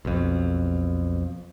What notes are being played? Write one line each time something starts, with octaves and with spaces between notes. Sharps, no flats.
B1 F2